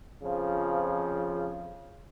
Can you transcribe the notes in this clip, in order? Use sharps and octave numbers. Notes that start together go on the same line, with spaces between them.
F2 C#3 F3